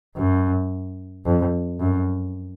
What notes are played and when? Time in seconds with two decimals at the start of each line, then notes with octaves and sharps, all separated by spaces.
0.16 F#2
1.25 F2
1.80 F#2